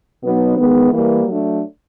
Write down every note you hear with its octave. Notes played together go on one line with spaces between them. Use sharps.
B2 F#3 B3 D#4
D#3 G#3 B3
E3 G3 A#3
F#3 A3 D4